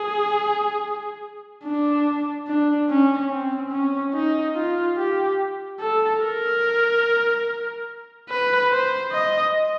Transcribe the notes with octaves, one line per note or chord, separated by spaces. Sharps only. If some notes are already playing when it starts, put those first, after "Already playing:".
Already playing: G#4
D4
D4
C#4
C4
C#4
D#4
F4
G4
A4
A#4
B4
C5
D#5